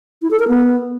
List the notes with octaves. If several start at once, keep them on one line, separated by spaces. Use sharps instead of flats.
E4
A4
A#4
B3